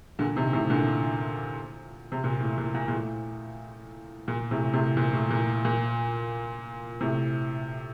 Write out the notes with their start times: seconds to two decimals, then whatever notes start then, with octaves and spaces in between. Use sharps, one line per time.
0.19 A#2 D3
0.36 C3 D#3
0.53 A2 C3
0.70 A#2 D3
2.12 C3
2.24 A#2
2.40 A2
2.58 A#2
2.74 A#2
2.88 A#2
2.92 A2
4.28 A#2
4.51 A2 C3
4.73 A2 C3
4.97 A#2
5.13 A2
5.30 A#2
5.65 A#2
7.01 A2 C3